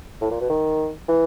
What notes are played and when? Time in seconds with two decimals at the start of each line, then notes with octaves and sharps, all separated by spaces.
0.21 A2
0.31 A#2
0.41 B2
0.50 D#3
1.09 E3